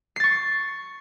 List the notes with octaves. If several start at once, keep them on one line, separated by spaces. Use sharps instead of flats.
C#6 A6 C7